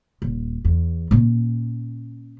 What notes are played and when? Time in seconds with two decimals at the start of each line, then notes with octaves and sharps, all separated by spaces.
0.22 D#1
0.65 E2
1.11 A#2 C#4